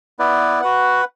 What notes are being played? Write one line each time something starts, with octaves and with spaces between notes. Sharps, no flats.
B3 E4 B4 D5
F#4 B4 F#5